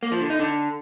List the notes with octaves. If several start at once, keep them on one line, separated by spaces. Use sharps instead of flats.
A#3
F3
D3
D#4
D3